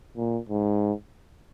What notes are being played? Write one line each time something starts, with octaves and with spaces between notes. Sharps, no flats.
A#2
G#2